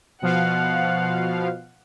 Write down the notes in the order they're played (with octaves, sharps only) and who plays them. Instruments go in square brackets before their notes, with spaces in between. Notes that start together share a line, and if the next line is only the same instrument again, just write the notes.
[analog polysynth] B2 F3 F5 [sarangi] F#5